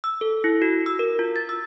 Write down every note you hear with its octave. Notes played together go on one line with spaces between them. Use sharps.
E6
A4
E4
F#4
E6
A#4
F4
A6
E6